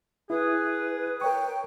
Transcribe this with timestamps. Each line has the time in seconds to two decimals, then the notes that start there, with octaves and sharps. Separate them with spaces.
0.30 E4 G#4 B4
1.21 A#4 C#5 G5 C#6